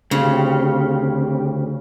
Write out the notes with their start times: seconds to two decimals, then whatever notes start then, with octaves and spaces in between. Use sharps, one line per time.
0.11 D2 C#3 C4 G4